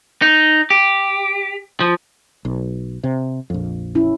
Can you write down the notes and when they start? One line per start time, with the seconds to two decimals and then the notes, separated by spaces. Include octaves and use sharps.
0.22 D#4
0.70 G4
1.80 F3
2.45 B1
3.04 C3
3.50 A#1 F2
3.95 C#4 E4